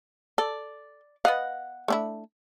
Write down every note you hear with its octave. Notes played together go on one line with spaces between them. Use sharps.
A4 D5
B3 D#5 F5 F#5
A3 D4 E4